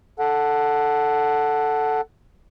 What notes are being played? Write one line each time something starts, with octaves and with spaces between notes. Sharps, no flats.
A4 F#5